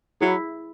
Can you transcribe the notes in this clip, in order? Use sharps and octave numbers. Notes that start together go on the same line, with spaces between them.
F#3 E4 G#4